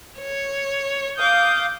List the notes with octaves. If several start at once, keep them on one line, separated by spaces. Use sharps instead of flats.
C#5
F5 D6 D#6 G6